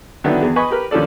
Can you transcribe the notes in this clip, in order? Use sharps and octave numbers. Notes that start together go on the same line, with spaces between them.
D3 D#3 F#3 B3 D4 E4
E2 G#4
B4 D#5 G#5 B5 C#6
G4 A#4 B4
D#2 F3 C#4 D4 A4 D5